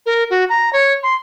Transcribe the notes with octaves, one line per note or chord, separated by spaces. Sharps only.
A#4
F#4
A#5
C#5
C6